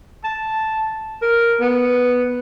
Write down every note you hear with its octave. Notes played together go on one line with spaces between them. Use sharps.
A5
A#4
B3